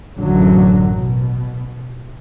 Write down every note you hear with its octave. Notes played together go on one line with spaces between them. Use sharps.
A1 F#2 D3 F#3
B2